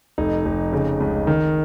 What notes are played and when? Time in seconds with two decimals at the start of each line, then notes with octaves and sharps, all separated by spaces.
0.18 F1 D#4
0.45 F1
0.72 C#3
1.00 C#2
1.27 D#3